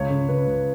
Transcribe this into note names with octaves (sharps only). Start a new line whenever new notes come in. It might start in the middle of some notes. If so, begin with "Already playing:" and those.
Already playing: C#2 C#5
C#3
C#3 B4
C#2